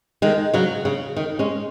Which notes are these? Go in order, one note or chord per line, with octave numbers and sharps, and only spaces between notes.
D#3 G#3
C#3 F#3
C#3
D#3
G#3 C#4